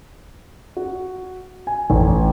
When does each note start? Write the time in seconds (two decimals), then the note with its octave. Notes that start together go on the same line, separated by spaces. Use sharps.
0.77 F#4
1.67 G#5
1.90 A1